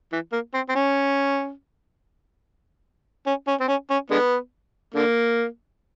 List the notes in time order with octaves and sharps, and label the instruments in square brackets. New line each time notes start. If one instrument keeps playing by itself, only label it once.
[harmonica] E3
A#3
C4
C4
C#4
C#4
C#4
C4
C#4
C#4
D3 G#3 B3
D3 A#3